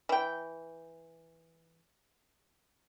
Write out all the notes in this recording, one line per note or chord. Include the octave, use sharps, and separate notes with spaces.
E3 G5